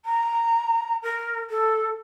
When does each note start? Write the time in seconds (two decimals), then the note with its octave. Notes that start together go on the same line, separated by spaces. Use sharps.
0.05 A#5
1.02 A#4
1.50 A4